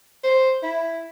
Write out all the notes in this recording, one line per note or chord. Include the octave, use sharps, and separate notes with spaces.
C5
E4